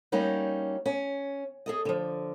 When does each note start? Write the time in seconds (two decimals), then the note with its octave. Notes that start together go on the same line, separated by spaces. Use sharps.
0.12 G3 A#3 C#4 D#4 F#4
0.86 C#4
1.66 G#4 A4 D#5
1.85 D3 F3